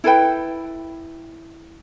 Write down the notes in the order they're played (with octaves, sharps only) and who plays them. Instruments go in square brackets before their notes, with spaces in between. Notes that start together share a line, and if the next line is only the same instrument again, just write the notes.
[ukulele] E4 A4 B4 G5